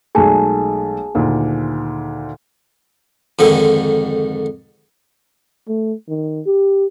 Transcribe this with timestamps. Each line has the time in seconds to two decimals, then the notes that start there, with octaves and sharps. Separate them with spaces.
0.15 B1 G#3 A3 G#4 G#5 A5
1.15 D2 A#2 D#3
3.39 F2 G#2 D3 D#3
5.68 A3
6.09 D#3
6.46 G4